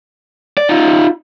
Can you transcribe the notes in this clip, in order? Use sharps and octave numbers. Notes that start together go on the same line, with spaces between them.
D5
D#4 F4